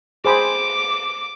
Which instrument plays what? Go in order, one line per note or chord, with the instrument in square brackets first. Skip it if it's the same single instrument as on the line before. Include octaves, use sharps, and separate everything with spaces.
[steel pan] G#4 C5 B5 [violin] D6